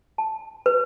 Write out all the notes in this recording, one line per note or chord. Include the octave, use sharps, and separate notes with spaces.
A5
B4